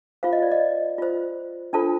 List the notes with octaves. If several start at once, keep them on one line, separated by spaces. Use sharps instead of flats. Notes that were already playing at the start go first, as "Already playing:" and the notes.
F4 C5 F5
D#5
D5
D#5
F4 C5
D4 F4 A4 C5 A5